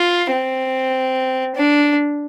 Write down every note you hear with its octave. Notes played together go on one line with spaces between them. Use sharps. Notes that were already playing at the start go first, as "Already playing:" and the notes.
Already playing: F4
C4
D4